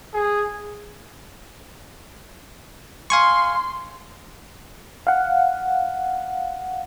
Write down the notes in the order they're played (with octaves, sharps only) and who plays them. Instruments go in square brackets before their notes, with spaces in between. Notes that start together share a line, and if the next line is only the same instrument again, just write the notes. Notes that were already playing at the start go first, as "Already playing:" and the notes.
[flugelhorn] G#4
[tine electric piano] F5 G#5 C#6 [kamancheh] C6
[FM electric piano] F5 F#5